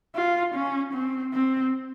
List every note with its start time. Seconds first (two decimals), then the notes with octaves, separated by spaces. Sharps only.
0.16 F4
0.55 C#4
0.94 C4
1.34 C4